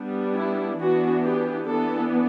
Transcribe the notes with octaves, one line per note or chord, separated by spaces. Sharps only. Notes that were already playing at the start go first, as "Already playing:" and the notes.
Already playing: G3 B3 D4
E4
E3 B3 D4 F#4
G4
E3 B3 D4 A4